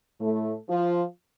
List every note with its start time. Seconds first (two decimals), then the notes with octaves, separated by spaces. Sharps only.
0.20 A2 A3
0.70 F3 F4